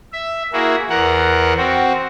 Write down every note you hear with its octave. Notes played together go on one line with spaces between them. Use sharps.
E5
A#3 E4 F#4 G#4
E2 A#4 F#5
C4 F#4